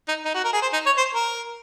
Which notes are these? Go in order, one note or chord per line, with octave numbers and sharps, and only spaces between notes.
D#4
D#4
F#4
A#4
G#4
C5
D#4
C#5
C5
A#4